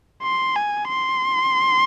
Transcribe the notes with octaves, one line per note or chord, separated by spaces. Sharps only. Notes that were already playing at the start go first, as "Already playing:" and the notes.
C6
G#5
C6